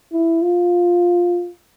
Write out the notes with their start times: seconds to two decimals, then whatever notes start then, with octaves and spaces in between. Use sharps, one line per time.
0.12 E4
0.42 F4